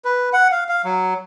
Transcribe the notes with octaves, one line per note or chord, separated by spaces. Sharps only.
B4
F#5
F5
F5
F#3